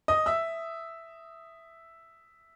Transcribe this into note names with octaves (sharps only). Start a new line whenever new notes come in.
D#5 D#6
E5 E6